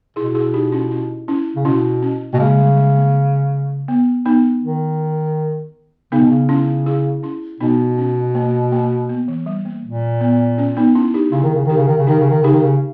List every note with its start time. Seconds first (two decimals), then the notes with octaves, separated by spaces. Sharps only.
0.16 B2 E4 G#4
0.35 E4 G#4
0.54 D#4 G4
0.72 C#4 E4
0.91 C#4 E4
1.28 C#4 E4
1.56 C#3
1.65 B2 C#4 E4
2.02 C#4
2.33 B2 A#3
2.40 C#3 G#3
2.58 G3
2.77 G#3
2.96 A#3
3.88 B3
4.26 B3 D#4
4.63 D#3
6.12 C#3 B3 D#4
6.20 B2
6.27 C#3
6.49 C#4 E4
6.86 E4 G#4
7.23 C#4 E4
7.60 B2 B3 D#4
7.98 C#4
8.35 A#3
8.72 A#3
9.09 B3
9.28 E3
9.46 G3
9.65 A#3
9.84 A#2
10.21 B3
10.58 C#4
10.77 B3 D#4
10.95 C#4 E4
11.14 D#4 G4
11.32 C#3 E4 G#4
11.43 D#3
11.54 C#3
11.65 D#3 D#4 G4
11.77 C#3
11.87 D#3
11.97 C#3
12.07 D#3 D#4 G4
12.19 C#3
12.30 D#3
12.41 C#3 D#4 G4
12.52 D#3
12.62 C#3